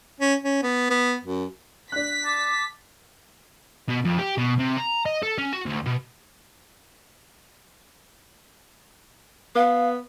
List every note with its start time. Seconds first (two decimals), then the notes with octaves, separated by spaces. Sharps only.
0.20 C#4
0.44 C#4
0.63 B3
0.90 B3
1.25 F#2
1.92 D4 F#6 B6
2.25 A5 D6
3.89 B2
4.05 F2
4.18 G4
4.38 B2
4.59 C3
4.77 A#5
5.06 D#5
5.22 A4
5.38 C#4
5.53 F#4
5.66 D2
5.86 B2
9.56 B3 F5